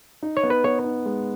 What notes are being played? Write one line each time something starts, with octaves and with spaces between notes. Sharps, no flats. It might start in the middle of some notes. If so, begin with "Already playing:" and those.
D#4
C#5
B3
B4
B3 C#5
D#4
G#3